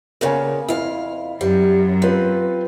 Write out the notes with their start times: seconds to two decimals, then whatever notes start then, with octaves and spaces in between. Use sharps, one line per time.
0.21 A#2 C#3 B3 A#4 C#5 G#5
0.68 F2 E4 F5
1.41 F#2 G3
2.02 C4 F4 B4